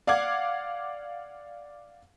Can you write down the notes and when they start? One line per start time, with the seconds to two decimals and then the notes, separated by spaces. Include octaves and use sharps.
0.07 D5 F5 F#5 D6 G#6